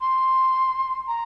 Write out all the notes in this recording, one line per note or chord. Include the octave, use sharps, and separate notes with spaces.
C6
A#5